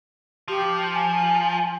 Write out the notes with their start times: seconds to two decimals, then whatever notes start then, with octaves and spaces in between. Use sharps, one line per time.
0.48 F3 G4
0.94 G#5